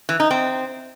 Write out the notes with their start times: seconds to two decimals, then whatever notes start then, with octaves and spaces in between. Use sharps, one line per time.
0.09 E3
0.20 D#4
0.31 C4